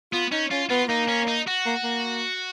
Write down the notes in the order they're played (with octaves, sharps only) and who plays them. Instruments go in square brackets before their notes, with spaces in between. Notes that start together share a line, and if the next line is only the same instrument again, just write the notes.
[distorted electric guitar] B3 [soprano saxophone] F4
[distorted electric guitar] C#4 [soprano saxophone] D#4
[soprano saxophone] C#4 [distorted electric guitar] F4
[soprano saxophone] B3 [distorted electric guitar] F4
[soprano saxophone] A#3 [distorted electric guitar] D#4
[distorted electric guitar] C#4
D#4
F#4
[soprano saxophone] A#3
A#3